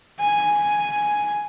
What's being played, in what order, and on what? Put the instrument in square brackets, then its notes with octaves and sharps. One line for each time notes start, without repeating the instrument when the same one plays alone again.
[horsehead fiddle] G#5